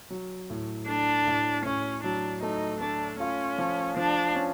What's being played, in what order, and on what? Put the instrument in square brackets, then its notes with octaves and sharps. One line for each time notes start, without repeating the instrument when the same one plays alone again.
[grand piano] F#3
A2
[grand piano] A3 [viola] D4
[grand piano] A2
[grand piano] A2 [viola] C#4
[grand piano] F#3 [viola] D4
[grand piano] A3 [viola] D#4
[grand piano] A3 [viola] D4
[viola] C#4 [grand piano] F4
[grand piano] F3
[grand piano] F3 [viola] D4
[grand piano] C#4